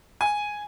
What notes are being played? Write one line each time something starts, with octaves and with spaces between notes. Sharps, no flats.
G#5